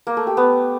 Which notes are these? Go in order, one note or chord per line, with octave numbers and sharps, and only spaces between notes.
A#3
A3
G4
B3